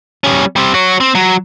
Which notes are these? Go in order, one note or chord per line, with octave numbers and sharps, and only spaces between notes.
G3 C#4
G3 C4
F#4 C#5
C4
F#3